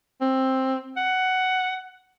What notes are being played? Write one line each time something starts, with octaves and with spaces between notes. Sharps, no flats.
C4
F#5